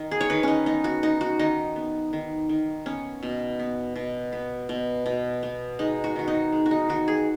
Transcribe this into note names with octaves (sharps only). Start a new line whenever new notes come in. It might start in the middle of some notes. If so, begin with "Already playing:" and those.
Already playing: D#3
G#4
C#5
D#3 B4
C#4 D#4
B3 D#4
F#4
B3 D#4
F#4
D#3 D#4
B3
D#3
D#3
B3 C#4
B2
B3
B2
B3
B2
B2
B3
G#3 D#4
F#4
D#3 F#4
D#4
G#3
F#4
D#4
D#3 F#4
G#4